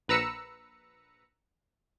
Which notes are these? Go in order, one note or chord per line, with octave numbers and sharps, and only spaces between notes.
A#1 B4 A#5 E6 C#7